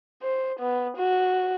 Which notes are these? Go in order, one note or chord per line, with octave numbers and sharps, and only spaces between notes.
C5
B3
F#4